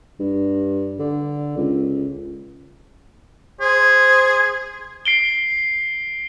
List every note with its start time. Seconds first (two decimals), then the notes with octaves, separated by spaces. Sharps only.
0.20 G2
0.99 D3
1.57 C#2
3.61 G#4 C5
5.05 C7 D7 G7